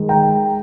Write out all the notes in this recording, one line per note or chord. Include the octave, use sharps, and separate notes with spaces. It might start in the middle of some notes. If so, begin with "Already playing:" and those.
Already playing: D#3 G#3
G5 A#5